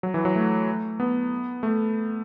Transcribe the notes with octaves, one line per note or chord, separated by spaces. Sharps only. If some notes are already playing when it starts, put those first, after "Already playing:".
F#3
E3
F#3
A3
B3
A3